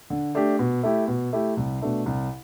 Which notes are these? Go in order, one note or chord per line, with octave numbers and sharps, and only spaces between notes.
D3
A3 D4 G4
B2
A3 E4 G4
B2
A3 E4 G4
C2
B2 A3 D4
C2